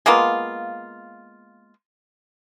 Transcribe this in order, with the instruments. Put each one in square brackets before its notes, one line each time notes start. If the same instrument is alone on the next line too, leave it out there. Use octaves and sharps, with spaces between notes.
[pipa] G#3 A#3 B3 F4